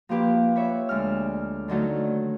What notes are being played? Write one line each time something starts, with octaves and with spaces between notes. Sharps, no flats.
F3 A#3 G4 B4
B4 C#5 E5
D2 G#3 F6
D3 D#3 F#3 A3